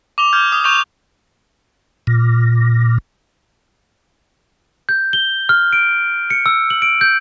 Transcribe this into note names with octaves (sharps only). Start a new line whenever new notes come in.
D6 F7 G7
F6 G6 G#6
D#6
C#6 G6 F7
A#2
G6
G7
F6
D7
C#7
E6
F#7
D7
G6